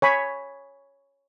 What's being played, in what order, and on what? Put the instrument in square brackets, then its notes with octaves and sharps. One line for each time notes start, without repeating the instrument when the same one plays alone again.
[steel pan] C#5 G#5 B5